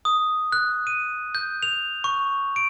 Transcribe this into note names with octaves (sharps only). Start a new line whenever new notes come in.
D#6
F#6
D#7
G6
F7
C#6
D7